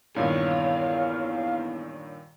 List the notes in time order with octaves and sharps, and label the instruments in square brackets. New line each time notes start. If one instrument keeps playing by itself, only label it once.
[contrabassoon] E2 [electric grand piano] G2 A#2 D#3 [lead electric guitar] C#5 [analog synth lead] F5